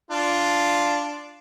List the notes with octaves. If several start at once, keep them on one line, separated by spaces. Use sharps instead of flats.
D4 F4